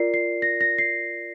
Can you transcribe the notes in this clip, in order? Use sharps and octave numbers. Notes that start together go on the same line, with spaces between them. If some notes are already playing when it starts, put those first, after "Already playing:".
Already playing: F4 A#4 D5 C7
C7
A#6
A#6
C7